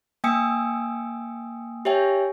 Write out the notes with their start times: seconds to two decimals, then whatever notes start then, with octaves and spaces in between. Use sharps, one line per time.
0.24 A#3 G5 G#5 D#6 E6 C#7
1.85 G4 C#5 E5 G5 G#5